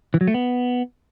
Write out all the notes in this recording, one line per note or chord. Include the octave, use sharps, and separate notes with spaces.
E3
F#3
A3
B3